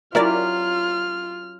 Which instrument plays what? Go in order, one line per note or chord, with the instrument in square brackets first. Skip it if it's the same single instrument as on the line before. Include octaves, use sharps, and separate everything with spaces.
[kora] F#3 C#4 G4 [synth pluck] E4 A#4 D5 [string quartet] F4 [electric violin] F6